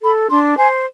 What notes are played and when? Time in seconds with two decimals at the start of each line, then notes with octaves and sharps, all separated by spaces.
0.02 A4 B5
0.30 D4 C6
0.57 C5 G#5